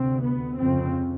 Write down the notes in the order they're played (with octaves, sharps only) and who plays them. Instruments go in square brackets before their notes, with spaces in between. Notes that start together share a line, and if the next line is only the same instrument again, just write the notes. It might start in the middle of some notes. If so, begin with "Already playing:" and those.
Already playing: [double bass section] D2 C3 C4
B3
F2 C#3 C4